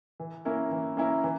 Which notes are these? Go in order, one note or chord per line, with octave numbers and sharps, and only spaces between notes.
E3
A#3 C#4 E4 A#4
E3
A#3 C#4 E4 A#4
E3